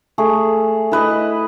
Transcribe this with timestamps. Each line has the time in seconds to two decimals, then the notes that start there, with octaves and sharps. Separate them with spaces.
0.18 A3 G#4
0.92 E4 B4 D#5